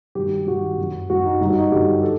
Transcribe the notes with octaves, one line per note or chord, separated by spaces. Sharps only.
G2 D#3 F#3 G4
G2 D#3 F#3 F#4
F#2
F#3
F#2 F#3 F#4
D#4
G2 D3 F#3 D#4
F#4
D#4
G2 D3 F#3 G4
A4